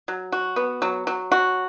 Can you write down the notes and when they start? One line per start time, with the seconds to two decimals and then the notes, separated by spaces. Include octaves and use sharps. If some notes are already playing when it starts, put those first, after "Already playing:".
0.08 F#3
0.32 F#4
0.56 B3
0.82 F#3
1.07 F#3
1.32 F#4